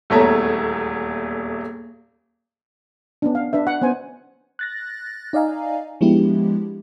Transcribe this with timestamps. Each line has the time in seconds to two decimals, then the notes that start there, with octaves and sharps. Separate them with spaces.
0.10 D#1 E2 A3 C#5 A5 A#5
3.22 B3 C#4 D4
3.35 F5
3.53 D4 B4 E5
3.67 F#5
3.81 B3 C#4 C5 G#5
4.59 F#6 A6 A#6
5.33 D#4 D5 D#5 F5 G#5 A#5
6.01 F3 G#3 B3 D4 E4 G4